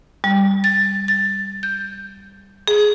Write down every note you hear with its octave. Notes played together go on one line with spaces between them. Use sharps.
G3
A6
A6
G6
G#4